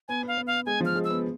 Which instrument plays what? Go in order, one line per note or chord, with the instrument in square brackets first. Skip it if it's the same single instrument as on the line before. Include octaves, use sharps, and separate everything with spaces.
[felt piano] B3 [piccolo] G#5
[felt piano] B3 [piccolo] F5
[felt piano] B3
[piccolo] F5
[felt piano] G#3 [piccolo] G#5
[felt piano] F3 [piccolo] F6
[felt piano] G#3
[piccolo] E6
[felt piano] B3